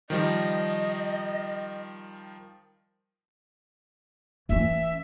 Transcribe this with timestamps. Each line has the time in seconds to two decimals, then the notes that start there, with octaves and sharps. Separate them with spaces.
0.10 D#3 F3 G3 D#5
4.49 E3 C#4 E5